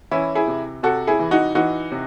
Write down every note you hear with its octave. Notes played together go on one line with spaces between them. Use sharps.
E3 C#4 E4
E4 G#4
C3
C3 F#4 A4
E4 G#4
E3
D#4 F#4
E3 D#4 F#4
C3